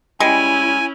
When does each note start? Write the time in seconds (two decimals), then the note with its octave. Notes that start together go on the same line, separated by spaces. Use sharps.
0.20 G3 G#3 C#4 E4 G#5